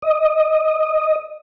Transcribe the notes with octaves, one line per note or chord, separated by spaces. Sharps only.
D#5